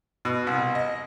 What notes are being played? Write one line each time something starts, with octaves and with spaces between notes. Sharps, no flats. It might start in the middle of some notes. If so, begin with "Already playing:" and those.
B2
C2
D#5